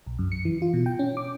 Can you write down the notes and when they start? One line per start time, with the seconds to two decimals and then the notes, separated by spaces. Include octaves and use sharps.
0.06 B1
0.19 F#2
0.32 C#7
0.45 E3
0.62 F4
0.74 B2
0.86 G5
0.99 C#4
1.17 D6